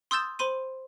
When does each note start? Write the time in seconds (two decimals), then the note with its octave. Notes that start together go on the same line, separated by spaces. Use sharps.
0.11 C6 D#6 E6 G6 A6 E7
0.39 C5 B5 C6 D#7